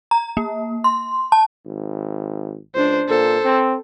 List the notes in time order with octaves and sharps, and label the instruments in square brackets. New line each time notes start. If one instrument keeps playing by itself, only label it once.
[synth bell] A#5
A#3
C6
A5
[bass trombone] G#1
[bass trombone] C#2 [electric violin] D4 C5
[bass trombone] A#2 [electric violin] A4 C5
[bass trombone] C4